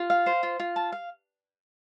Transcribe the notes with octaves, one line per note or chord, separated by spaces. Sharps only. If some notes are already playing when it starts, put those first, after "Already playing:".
Already playing: F4
F5
C5
F4
F4
A5
F5